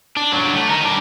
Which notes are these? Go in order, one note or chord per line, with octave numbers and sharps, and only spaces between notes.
D4
F#3 D4
A3
D#4 A#4
G3 D4